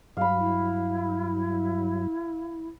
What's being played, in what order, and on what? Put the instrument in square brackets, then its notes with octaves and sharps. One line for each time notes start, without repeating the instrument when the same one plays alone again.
[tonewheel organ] G2 F#3 [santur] F5 B5
[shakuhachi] E4